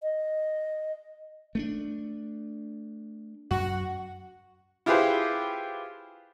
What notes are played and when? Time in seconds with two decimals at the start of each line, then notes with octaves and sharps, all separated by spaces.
0.03 D#5
1.55 A3 B3 D4
3.51 F#2 F#4
4.86 E4 F4 G4 G#4 B4 C5